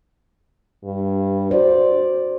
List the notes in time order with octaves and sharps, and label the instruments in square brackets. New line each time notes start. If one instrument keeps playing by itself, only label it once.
[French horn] G2
[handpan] F#4 C5 [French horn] D5